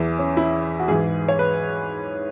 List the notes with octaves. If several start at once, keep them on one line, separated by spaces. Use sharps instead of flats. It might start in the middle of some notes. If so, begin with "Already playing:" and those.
Already playing: E2 E3
C#4
E4
F#4
G#2 E3 G#4
C#5
B4